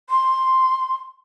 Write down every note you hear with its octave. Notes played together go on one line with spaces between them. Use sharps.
C6